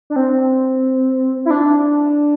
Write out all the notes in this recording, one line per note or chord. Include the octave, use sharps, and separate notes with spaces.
D4
C4
E4
D4